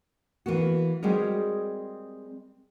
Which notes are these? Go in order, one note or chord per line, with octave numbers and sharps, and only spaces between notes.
E3 A#3 B3 F#4
G3 G#3 C4 F#4 G#4 A#4